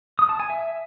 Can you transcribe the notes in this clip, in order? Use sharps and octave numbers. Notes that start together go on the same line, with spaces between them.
D#6
A5
G#5
E5